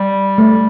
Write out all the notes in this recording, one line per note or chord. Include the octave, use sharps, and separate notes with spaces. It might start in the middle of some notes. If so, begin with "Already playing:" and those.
Already playing: G3
A3